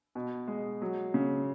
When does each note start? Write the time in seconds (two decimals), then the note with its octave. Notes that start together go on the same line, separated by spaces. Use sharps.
0.15 B2
0.48 G#3
0.82 F#3
1.14 C#3